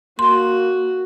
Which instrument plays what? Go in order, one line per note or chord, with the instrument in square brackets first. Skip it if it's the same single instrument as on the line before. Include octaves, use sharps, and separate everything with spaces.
[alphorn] A#3 [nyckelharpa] F#4 [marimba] C6